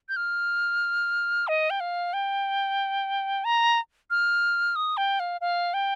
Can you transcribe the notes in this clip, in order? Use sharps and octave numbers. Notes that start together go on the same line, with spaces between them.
G6
F6
D#5
G5
F5
G5
A#5
F6
D#6
G5
F5
F5
G5